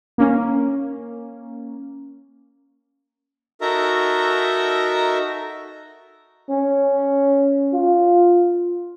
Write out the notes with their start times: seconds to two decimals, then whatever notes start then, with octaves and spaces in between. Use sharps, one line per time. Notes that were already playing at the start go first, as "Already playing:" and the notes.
0.18 A#3 C#4
3.61 D#4 F#4 A4 A#4 E5 A#5
6.50 C#4
7.73 F4